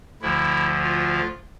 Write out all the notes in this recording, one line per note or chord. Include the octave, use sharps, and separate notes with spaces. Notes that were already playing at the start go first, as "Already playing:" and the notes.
D2 D3 F3 E4
F4